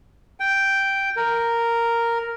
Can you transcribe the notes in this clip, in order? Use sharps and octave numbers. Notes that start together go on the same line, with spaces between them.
G5
A#4